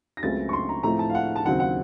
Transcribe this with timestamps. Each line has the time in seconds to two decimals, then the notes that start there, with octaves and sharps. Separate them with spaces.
0.17 A#6
0.23 C#2 C#3 F#3 A3 C4 A6
0.49 C#6
0.53 C6
0.69 A#5
0.83 A2 F3 A3 C4 A#5
0.99 A5
1.10 F5
1.15 F#5
1.36 A5
1.45 D#2 C#3 F#3 C4 F#5
1.60 F#5